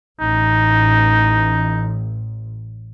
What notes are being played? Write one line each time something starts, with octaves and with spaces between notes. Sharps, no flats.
A1 D#4